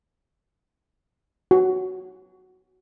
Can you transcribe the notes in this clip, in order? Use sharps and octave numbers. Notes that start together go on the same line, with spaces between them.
F#4